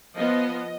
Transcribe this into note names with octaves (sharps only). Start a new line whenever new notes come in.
F3 B3 D#5